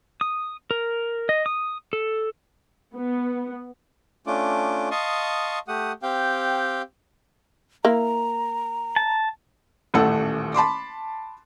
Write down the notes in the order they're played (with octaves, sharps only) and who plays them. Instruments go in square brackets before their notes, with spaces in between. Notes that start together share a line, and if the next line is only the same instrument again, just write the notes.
[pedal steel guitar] D#6
A#4
D#5
D#6
A4
[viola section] B3
[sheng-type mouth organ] A3 C#4 D4 F4 D6
D#5 F5 A5 C6 C#6 D#6
A3 G4 F#5 D#6
C4 G4 F5 G5
[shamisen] A#3 E4 [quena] A#5
[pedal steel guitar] A5
[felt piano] D#1 A1 A3 A4 F#5
A5 B5 C6 D6